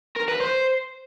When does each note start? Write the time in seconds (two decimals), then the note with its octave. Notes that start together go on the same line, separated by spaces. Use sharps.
0.17 A#4
0.28 B4
0.40 C5